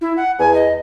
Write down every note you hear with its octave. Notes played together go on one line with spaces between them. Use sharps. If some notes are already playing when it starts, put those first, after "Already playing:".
E4
F#5
E2 G#5
D#5